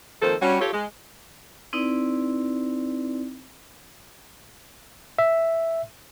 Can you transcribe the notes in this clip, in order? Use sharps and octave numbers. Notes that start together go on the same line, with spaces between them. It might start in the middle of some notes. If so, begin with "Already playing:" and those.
D#3 F3 A#3 C4 A4 C5
G3 C#4 F#4
F4 G4 A4 C#5
G#3
C4 D#4 E4 B4 D5
E5